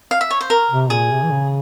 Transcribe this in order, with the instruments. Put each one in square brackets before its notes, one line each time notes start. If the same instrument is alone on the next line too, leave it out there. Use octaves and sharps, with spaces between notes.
[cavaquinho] F5
E5
C#5
C5
A#4
[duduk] C3
[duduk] A#2 [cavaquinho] G#4
[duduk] C3
E3
C#3